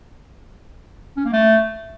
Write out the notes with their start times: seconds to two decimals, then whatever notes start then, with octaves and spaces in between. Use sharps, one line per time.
1.17 C#4
1.25 A#3
1.33 A3